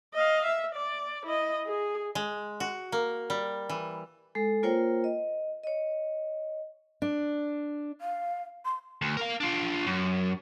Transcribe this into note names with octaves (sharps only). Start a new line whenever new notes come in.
D#5 F5
E5
D5
E4 D#5
G#4
G#3
F#4
A#3
G3
E3
G#3 A4
A#3 F4 A#4 C5 C#5 G5
D#5
C#5 D#5
D4
F5
C6
D2
A#4 F5
D4 F4
F#2